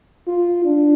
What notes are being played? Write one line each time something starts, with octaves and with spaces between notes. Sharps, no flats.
F4
D4